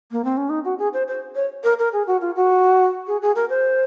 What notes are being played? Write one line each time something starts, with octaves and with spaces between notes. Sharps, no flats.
A#3
C4
C#4
D#4
F#4
G#4
C5
C5
C#5
A#4
A#4
G#4
F#4
F4
F#4
G#4
G#4
A#4
C5